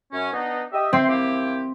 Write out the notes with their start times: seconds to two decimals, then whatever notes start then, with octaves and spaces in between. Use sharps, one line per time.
0.13 F#2 C#4
0.33 B3 D4 D#4
0.73 G4 D#5 E5
0.93 C4 E5 G5 C6
1.09 A#3 E4 G4